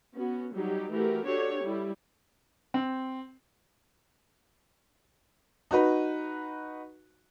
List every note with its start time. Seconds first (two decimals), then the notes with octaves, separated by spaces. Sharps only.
0.15 B3 C#4 F#4
0.53 F#3 G3 D#4 G4
0.92 E3 A3 F#4 G4 A#4
1.25 D4 F#4 G4 A4 C#5
1.62 G3 E4
2.74 C4
5.71 D#4 F#4 B4